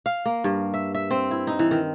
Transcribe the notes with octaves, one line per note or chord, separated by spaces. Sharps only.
F5
A#3
G2
E5
E5
C4
E4
D#4
E3
D#3